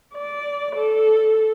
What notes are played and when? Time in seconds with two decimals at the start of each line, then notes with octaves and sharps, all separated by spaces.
0.15 D5
0.76 A4